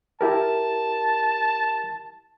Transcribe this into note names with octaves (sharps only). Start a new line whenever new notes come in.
E4 G4 A#4 A5